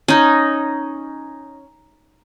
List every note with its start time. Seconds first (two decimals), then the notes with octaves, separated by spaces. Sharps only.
0.08 C#4 D#4